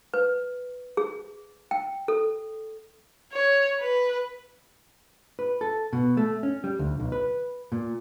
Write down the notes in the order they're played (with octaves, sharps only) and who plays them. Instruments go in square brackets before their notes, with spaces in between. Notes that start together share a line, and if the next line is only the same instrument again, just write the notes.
[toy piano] B4
G#4
G5
A4
[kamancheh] C#5
B4
[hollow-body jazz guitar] B4
A4
B2
A3
C#4
G3
D2
B1
B4
A#2